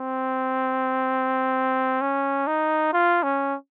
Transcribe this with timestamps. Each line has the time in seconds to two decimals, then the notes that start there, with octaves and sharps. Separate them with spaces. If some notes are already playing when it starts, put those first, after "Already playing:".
Already playing: C4
2.02 C#4
2.47 D#4
2.94 F4
3.24 C#4